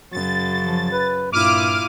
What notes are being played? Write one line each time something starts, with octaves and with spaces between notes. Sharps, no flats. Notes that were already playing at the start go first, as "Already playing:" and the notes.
F#2 C#3 A6
F3
B4
G2 A#2 E4 F4 D6 F6 D#7